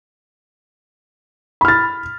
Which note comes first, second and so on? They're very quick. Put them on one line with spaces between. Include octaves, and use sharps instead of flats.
B5 F6 A6